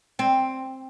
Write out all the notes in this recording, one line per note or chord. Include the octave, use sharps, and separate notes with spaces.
C4